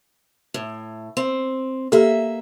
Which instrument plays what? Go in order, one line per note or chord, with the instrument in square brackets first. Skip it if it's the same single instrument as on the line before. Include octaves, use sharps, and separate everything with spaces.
[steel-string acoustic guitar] A2
C4
[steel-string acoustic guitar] A#3 E5 [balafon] G4 A4